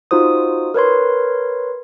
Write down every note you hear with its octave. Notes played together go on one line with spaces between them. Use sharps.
D#4 F4 F#4 C5 D#6
A#4 B4 C#5 C6